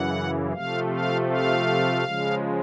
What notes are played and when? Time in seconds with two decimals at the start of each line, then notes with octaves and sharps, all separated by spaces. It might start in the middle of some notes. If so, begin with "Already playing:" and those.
Already playing: F#2 C#3 E3 F#5
0.53 C3 F3 A3 F5
0.91 F5
1.29 F5
2.04 C#3 F3 G#3